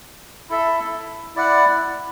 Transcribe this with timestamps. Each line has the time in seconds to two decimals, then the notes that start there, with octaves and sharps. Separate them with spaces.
0.50 E4 A4 E5
1.35 E4 D5 F#5